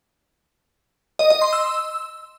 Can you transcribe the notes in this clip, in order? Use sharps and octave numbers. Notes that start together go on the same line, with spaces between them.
D#5
D#5
C6
E6